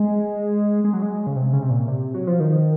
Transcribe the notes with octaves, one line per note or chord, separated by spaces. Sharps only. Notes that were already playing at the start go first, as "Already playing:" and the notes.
Already playing: G#3
G#3
F#3
G#3
C#3
C3
C#3
C3
A#2
C3
F#3
F3
D#3